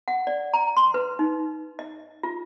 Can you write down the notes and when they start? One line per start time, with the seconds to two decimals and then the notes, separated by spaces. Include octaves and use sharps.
0.08 F#5
0.27 D5
0.53 A#5
0.77 C6
0.94 B4
1.19 D#4
1.79 D#5
2.23 F4